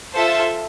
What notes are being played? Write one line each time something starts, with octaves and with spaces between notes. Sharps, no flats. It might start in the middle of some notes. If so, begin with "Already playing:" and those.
F4 A4 C5 E5 A5